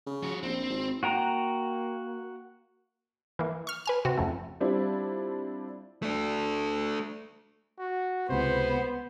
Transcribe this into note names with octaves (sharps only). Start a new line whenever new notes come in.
C#3
F3 F#4
A#1 C4
G#1
A#3 F#4 G5 A#5
E3 A#3
C#6 F6
B4 G#5 F6
C3 F#4
F2 C#3 A3
G3 C4 D4 E4 F4 G4
A3 D4
F#4
C#2 C3 B3 C5